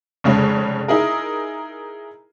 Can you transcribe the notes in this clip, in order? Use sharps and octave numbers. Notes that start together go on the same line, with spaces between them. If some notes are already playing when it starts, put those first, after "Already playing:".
F1 C#3 G#3 C#4
D#4 E4 G#4 A#4